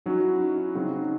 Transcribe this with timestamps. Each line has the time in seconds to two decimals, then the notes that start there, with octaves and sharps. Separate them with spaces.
0.06 F#3 C#4 D#4 F#4
0.23 E4
0.40 D#4
0.58 E4
0.75 C#3 F#3 C4 D#4 F#4
0.87 C#4
0.99 D#4